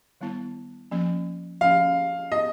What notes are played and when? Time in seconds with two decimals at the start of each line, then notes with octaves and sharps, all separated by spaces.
0.21 D#3 G3 B3 E4
0.91 F3 A#3 C#4
1.61 F3 A#3 C#4 F5
2.32 B3 E4 G#4 D#5